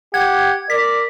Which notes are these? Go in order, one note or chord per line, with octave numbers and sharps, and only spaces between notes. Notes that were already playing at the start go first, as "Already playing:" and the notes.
G4 F#5 G#6
A#4 D5 B6